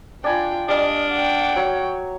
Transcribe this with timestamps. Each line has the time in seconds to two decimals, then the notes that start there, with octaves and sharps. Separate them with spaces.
0.24 D4 F4 G5 G#5 B5
0.69 G3 D4 D#5 F5
1.13 F#5 G5
1.56 F#3 C#5